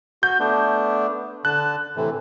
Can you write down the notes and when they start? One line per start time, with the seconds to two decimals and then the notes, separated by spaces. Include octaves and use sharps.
0.23 F#4 G6
0.40 A3 B3 D4
1.45 D3 A5 F#6
1.96 A2 C3 E3